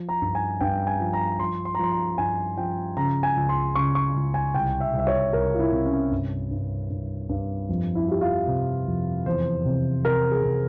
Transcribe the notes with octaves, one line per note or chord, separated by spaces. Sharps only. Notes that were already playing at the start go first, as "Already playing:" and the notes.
Already playing: F3
A#5
G2
G#5
G2 G5
G#5
F3
A#5
F3 C6
C6
A#5
F3 C6
A#5
G2 G#5
F3 G5
C#3 A#5
G#5
C#2
C6
C#3 C#6
C#6
C#2
G#5
C2 G5
E5
C2
E5
C#5
C2 A#4
F4
E4
C3
C#4
G2
G2
G2
G2
F2
E4
F3 G4
F4
C3
F2
E2 C5
C3
C3 A#4
G#4
C3